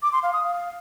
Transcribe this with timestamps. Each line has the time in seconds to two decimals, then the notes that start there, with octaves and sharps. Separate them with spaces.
0.03 D6
0.13 C6
0.23 F5
0.33 D#6
0.43 F5